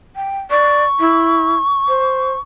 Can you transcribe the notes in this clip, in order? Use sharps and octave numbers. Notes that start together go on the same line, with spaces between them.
G5
D5 C#6
E4
C5